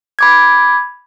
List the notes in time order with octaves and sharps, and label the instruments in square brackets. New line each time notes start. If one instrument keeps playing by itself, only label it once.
[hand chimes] B5 D6 G#6